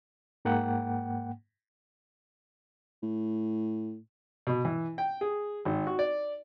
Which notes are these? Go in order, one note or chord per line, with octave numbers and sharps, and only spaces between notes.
G#2 A#3 F#5 G5
A2
B2
E3
G5
G#4
G#1
F#4
D5